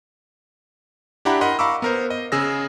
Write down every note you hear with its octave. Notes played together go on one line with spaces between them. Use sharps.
D4 E4 G4 F#5 A#5 B5
A#4 D#5 F#5 B5 C6
F5 A#5 B5 C#6 D6 E6
B3 A#4 C5
D#5
C#3 G#4 E6 A#6